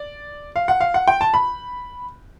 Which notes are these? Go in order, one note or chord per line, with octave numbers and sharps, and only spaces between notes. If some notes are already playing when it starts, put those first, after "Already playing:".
Already playing: D5
F5
F#5
F5
F#5
G5
A5
B5